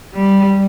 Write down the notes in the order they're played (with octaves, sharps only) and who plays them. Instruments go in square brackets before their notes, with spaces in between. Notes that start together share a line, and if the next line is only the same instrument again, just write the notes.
[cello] G3